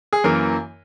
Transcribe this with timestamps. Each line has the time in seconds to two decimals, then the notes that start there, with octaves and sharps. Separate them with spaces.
0.13 G#4
0.24 F#2 E3 A#3 A#4